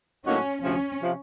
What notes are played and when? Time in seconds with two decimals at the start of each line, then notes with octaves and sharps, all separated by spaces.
0.26 A2 F#3 A#3 C#4 D#4 F#4
0.62 D2 C3 F3 C#4
1.00 C3 F3